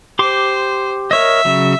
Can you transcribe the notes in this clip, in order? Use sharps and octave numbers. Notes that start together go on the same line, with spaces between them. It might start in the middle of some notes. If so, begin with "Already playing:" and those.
G4 C5 C6 D6
A#4 C#5 D#5 E5
C#3 F#3